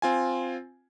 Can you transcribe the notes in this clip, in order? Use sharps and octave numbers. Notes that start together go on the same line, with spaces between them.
C4 F4 G#5